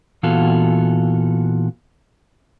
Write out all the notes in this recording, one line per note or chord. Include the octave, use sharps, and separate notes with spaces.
A#2 E3 B3 F4 F#4 A4